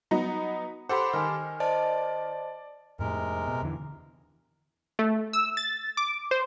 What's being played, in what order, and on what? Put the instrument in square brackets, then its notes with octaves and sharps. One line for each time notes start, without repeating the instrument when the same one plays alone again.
[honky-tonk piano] F#3 B3 D#4 [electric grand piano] A#5 B5
[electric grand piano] G4 A4 C5 [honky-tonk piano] F#5 [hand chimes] B5 C6 D6
[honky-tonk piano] D#3 [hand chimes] G#5 F6
[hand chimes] C5 D#5 A5 [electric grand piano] D5
[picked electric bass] F2 A2 [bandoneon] C3 G#3 A#4
[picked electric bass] B2
E2 D3 E3
[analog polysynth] A3
E6
A6
D6
C5